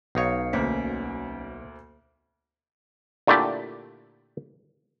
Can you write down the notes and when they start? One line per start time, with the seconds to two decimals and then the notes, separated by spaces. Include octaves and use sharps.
0.15 B1 D#4 C#5 F5 C#7
0.53 D2 A#3 C#4 C5 B6
3.27 A#2 D3 A3 D4 E4 G4